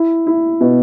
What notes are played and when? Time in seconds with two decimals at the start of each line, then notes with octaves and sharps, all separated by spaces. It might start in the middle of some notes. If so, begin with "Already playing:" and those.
Already playing: E4
0.27 E4
0.61 B2